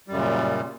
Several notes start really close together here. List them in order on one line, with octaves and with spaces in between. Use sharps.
G3 F#2 C#3 A#2